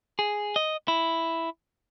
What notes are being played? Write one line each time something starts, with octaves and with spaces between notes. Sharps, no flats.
G#4
D#5
E4